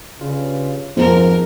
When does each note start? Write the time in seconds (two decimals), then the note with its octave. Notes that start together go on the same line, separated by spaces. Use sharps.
0.21 G2 C#3 F4
0.97 F2 G#2 F3 A#4